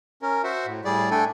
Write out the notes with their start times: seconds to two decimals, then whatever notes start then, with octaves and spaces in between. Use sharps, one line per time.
0.22 C#4 A#4
0.44 F#4 C5 E5 F#5
0.66 A2
0.85 A2 G3 G#4 D5
1.11 A3 D4 A4 G5 G#5